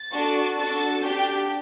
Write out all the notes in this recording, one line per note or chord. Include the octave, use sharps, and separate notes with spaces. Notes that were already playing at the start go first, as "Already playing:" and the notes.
Already playing: A6
D4 F#4 A4
D4 F#4 A4 A6
D4 G4 G6